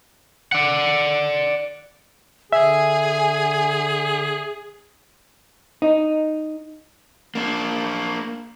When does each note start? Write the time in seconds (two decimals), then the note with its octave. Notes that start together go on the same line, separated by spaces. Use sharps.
0.52 D5 F#5
2.53 D3 G#4 E5 G#5
5.82 D#4
7.35 A#3 D4